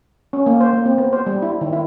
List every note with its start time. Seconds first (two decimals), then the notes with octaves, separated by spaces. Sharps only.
0.33 C#4
0.46 A#3
0.61 C5
0.73 A#3
0.86 C4
0.98 B3
1.13 C5
1.26 G3
1.42 E4
1.61 D#3
1.73 E4